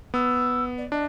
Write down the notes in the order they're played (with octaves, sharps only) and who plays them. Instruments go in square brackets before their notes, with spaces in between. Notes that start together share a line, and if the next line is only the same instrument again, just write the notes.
[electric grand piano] B3 [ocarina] E6
[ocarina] D5
[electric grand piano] D4 [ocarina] D#5